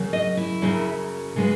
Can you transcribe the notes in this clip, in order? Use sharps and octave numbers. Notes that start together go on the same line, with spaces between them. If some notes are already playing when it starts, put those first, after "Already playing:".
Already playing: F#2 C#3 F#3
D#5
E4
F#2 C#3 F#3
C#3 G#3 B3